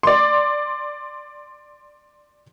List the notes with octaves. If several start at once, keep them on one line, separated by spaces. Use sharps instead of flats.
D5 C6